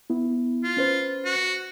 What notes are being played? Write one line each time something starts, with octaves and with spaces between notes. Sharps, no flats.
B3 E4
F4
C#4 B4 C5
F#4